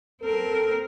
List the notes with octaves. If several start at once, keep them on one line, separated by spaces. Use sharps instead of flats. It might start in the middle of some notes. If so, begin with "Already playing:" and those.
C4 A4 A#4